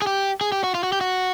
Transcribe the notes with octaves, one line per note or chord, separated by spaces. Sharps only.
G#4
G4
G#4
G4
F#4
F4
F#4
G4
F#4